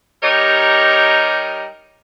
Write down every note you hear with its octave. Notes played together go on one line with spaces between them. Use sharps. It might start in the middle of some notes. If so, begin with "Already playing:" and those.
G3 D#4 G4 A#4 C#5 D#5